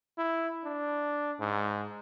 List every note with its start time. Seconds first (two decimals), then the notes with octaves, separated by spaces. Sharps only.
0.18 E4
0.65 D4
1.40 G#2